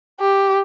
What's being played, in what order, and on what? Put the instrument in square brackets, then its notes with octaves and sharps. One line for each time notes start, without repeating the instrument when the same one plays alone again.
[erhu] G4